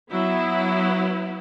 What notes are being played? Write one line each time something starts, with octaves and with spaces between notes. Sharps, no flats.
F#3 B3 E4